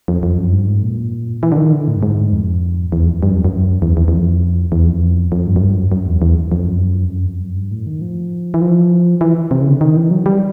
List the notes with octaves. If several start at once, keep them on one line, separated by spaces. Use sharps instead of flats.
F2
F2
F#2
G2
G#2
A#2
E3
D3
D#3
D3
A2
G2
G#2
F2
E2
F2
G2
F#2
F2
F#2
E2
E2
E2
F2
E2
F2
F2
G2
F#2
G2
F#2
F#2
E2
E2
F2
F#2
F2
F#2
F2
F#2
G2
A2
D#3
F3
E3
F3
E3
C3
C#3
D3
D#3
E3
F#3
G3